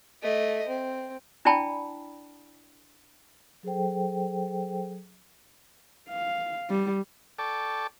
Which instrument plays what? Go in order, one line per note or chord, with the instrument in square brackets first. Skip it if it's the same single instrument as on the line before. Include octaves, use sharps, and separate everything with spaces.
[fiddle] A3 D#5
C4
[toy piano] D4 E4 D5 G5 A5 B5
[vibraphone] F#3 G#4 A4 C5 G5
[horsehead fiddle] F5
G3
[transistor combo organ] A4 D5 G5 A5 C#6 D6